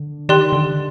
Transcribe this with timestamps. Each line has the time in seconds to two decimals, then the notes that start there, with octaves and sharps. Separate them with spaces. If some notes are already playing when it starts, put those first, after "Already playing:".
Already playing: D3
0.29 D#3 G4 D5 G5 C6 F#6
0.53 D3